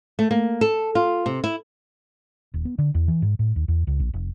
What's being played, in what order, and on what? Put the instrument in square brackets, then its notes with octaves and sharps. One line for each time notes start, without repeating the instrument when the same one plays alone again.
[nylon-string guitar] A3
A#3
A4
F4
C3
E4
[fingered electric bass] D#1
B3
D3
E2
E3
G#2
A2
D#2
E2
C#2
A#1
F1